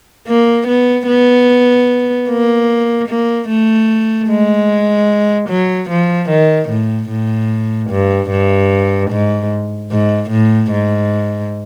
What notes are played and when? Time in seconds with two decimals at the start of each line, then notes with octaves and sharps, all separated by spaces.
0.27 A#3
0.68 B3
1.07 B3
2.29 A#3
3.08 A#3
3.49 A3
4.29 G#3
5.50 F#3
5.90 F3
6.30 D#3
6.70 A2
7.10 A2
7.91 G2
8.30 G2
9.11 G#2
9.91 G#2
10.30 A2
10.71 G#2